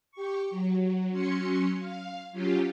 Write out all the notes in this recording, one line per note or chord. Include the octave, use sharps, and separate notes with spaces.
G4 C#6
F#3
F#3 C#4 C6 C#7
F5
F#3 C#4 F4 G4